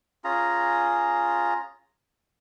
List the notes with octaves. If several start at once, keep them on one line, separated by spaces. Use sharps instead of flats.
C#4 F4 G#4 A#5